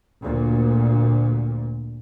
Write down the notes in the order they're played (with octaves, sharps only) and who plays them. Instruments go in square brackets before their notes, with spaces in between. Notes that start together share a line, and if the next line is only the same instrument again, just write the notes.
[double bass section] D2 A#2